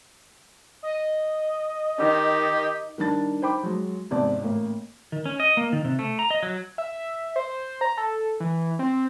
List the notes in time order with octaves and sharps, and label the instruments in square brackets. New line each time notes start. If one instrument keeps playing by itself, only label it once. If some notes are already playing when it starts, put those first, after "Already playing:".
[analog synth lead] D#5
[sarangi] D#3 [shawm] G4
[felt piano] D#3 G3 D4 A6
D#4 C5 G5 B5 D6
F#3 G#3
E2 G#2 C3 D5 A5
A1 A#3
[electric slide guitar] D#3
C#4
D#5
A#3
D#3
C3
A3
A#5
D#5
F#3
[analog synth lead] E5
C5
A#5
A4
E3
C4